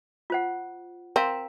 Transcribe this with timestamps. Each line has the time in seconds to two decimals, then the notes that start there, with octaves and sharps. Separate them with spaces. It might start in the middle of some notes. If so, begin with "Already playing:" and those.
0.30 F4 C5 F#5
1.16 C4 A#4 F5 A#5